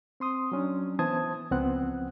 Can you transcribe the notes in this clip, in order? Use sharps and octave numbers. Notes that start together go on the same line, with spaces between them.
C4 C6 D#6
F#3 C#4 D4
E3 B3 C5 A5 D#6 G#6
C#2 F3 B3 C4 F#5 F#6